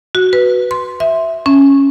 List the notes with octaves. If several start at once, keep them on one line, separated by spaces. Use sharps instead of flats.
F#4
B4
C6
E5
C#4